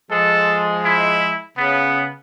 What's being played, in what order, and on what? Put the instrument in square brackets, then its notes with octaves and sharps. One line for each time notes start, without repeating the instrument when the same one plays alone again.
[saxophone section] F3 G#3 [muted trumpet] A4
[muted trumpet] E4
[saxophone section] C#3 [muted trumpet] B3